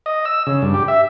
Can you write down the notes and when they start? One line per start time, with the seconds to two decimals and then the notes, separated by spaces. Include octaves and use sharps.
0.06 D#5
0.25 E6
0.47 C#3
0.62 G2
0.74 G4
0.88 E5